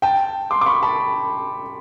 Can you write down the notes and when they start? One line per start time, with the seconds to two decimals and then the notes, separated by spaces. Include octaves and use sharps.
0.02 G5 A5
0.51 C6 D6
0.61 D6
0.66 B5 C#6
0.83 A5 B5